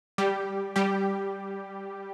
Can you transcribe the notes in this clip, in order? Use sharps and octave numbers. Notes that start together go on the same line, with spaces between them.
G3 G4
G3 G4